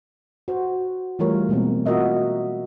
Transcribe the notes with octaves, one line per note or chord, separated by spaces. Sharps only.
F#4 C5
E3 G3 A3 F4 A#4 C#5
B2 G#3 A#3 C4
F4 F#4 A#4 D#5 E5